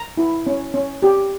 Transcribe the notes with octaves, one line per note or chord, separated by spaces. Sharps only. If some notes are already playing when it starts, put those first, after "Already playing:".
Already playing: A#5
E4
C#4
C#4
G4